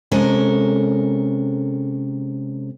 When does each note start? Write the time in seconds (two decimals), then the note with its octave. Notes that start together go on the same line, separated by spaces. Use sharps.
0.12 C3 G#3 C#4 A4 A#4